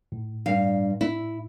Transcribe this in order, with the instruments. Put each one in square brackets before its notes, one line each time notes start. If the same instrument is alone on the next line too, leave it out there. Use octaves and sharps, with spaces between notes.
[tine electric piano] A2
[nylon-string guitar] G2 F5
E4